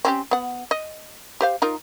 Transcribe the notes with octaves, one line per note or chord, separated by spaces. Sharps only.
C4 C#4 G4
B3 F#5
D#5
G4 C5 F5
D#4 F4 A#4